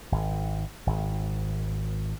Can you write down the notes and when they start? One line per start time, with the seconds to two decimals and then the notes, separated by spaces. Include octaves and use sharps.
0.12 G#1
0.87 G#1